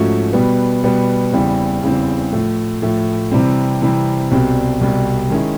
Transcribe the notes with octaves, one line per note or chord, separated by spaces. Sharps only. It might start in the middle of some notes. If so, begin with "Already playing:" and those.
Already playing: G#2 F3 A3 C#4 F#4
B2 G3 B3
B2 G3 B3
E2 C#3 E3 G3 C4
E2 C#3 E3 G3 C4
A2 F3 A3
A2 F3 A3
C3 E3 G3 C4
C3 E3 G3 C4
C2 B2 G3 C4
C2 B2 G3 C4
D#3 G#3 C#4 E4